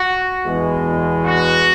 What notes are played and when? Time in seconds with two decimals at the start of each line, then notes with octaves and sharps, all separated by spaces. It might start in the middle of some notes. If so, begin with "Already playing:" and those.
Already playing: F#4
0.45 E2 B2 G#3
1.25 F#4